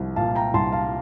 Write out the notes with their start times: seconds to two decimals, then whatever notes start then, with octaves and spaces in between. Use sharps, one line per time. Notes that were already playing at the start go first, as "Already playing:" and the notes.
Already playing: C2 F3
0.16 A#2 F5 A5
0.35 G5 A#5
0.54 C2 A5 C6
0.72 F5 A5